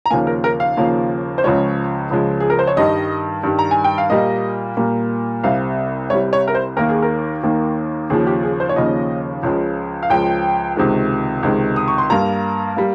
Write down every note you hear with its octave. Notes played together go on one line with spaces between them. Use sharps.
A#5
D#2 C#3 F3 A#3 G#5
A#4
A#4
F5
D#2 C#3 F3 A#3
C5
C#2 C#3 F3 G#3 C#5
C#2 C#3 F3 G#3
G#4
A#4
C5
C#5
G2 D#3 G3 D#5
G2 D#3 G3
A#5
G#5
G5
F5
A#2 G3 A#3 D#5
A#2 G3 A#3
C2 C3 G3 F5
C2 C3 G3 C#5
C#5
A#4
C5
D#2 D#3 A#3 A#4
G#4
A#4
D#2 D#3 A#3
D#2 C#3 F3 G#4
G4
G#4
C5
C#5
D#2 C#3 F3 D#5
C#2 C#3 F3 G#3
F5
C#2 C#3 F3 G#3 G5
C#2 C3 D#3 G#3
C#2 C3 D#3 G#3
D#6
C#6
C6
G2 G3 A#3 A#5
G3 A#3